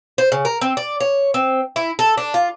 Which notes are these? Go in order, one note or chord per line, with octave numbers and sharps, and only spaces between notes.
C5
C#3
A#4
C4
D5
C#5
C4
E4
A4
D4
F4